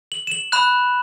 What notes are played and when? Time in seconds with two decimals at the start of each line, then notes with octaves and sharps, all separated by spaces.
0.12 F#7
0.27 E7
0.32 F#7
0.52 B5 F#6 E7